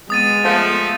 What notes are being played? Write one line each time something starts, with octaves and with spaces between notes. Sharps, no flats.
G#3 B3 D#6 A6 D#7
F3 A3